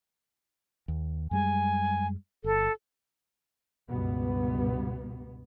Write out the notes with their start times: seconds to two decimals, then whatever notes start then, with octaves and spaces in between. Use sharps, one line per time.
0.88 D#2
1.31 F#2 G3 G#3 G#5
2.44 G1 A4
3.88 C#2 G2 B2 B3